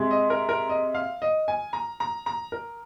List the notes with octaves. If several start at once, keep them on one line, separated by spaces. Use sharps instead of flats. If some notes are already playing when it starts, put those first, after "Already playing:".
Already playing: C3 G#3
D#5
A#4
A#4
D#5
F5
D#5
G#5
A#5
A#5
A#5
A#4